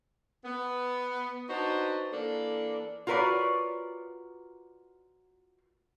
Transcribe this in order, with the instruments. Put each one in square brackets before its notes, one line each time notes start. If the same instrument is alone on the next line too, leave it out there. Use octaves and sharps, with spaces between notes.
[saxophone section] B3
D4 D#4 F#4 B4 C5
E3 A#3 D4 A4
[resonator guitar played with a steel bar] F4 F#4 A#4 B4 C#5 D5